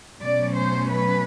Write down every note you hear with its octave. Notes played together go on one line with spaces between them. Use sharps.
B2 F#3 A3 C#4 D5
C5
B4